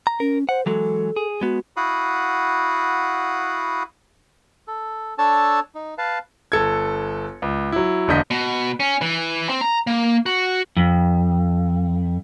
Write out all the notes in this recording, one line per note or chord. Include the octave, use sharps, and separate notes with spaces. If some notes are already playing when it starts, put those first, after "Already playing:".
A#5
C#4 A#4
C5 F#5
E3 F#3 G#3 A4
G#4
G#3 B3 F#4
E4 F#4 F5 F#5 B5 D#6
A4
D4 A4 C#5 A5 E6
D#4
B4 F5 A5
G1 A4 G#6
C#2
F#3 E4
E1 D3 A#3 D#5 G6 B6
B2
C#4
E3
C4
A#5
A#3
F#4
F2